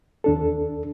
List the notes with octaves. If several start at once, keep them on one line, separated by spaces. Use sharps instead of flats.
D#2 D4 A4